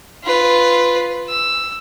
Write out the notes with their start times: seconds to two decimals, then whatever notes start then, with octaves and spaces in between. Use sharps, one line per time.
0.24 F4 B4
1.29 E6